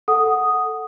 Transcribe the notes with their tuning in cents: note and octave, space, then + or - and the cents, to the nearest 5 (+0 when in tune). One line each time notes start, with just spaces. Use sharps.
A4 +0 F#5 +0 D#6 +0